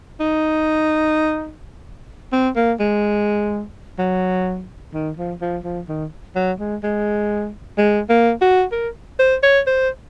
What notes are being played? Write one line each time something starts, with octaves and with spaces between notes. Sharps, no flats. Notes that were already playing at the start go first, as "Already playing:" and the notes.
D#4
C4
A#3
G#3
F#3
D#3
F3
F3
F3
D#3
F#3
G#3
G#3
G#3
A#3
F#4
A#4
C5
C#5
C5